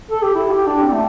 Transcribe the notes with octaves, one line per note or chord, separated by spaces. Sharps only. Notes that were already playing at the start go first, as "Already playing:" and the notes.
A4
G4
E4
G4
D4
C4
A3